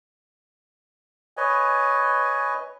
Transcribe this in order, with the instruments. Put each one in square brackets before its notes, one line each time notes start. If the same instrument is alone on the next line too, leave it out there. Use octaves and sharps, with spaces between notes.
[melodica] B4 C#5 D#5 G#5